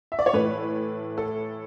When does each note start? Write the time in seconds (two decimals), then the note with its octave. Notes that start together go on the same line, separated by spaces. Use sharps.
0.12 E5
0.19 D5
0.26 C#5
0.33 A2 E3 A3 B4
1.18 A4